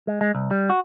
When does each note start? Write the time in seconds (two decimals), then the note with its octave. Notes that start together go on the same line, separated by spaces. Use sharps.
0.07 G#3
0.21 G#3
0.35 C2
0.51 G3
0.70 F#4